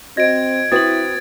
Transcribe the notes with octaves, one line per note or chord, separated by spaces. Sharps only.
C4 F#4 D#5 G#6 A#6 D7
C4 E4 F#4 B4 D#6 A6 F#7